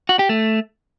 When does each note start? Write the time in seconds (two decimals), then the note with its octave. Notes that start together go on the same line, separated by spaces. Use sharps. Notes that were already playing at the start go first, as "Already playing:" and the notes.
0.09 F#4
0.19 G4
0.29 A3